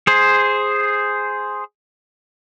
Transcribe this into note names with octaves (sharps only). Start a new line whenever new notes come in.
G#4 C5